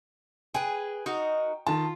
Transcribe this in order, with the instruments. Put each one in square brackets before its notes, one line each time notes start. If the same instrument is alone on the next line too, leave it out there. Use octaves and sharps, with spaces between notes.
[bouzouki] G#4 B4 [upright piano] G5
[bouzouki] D#4 F#4 A#4
[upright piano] D#3 A5 [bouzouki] F4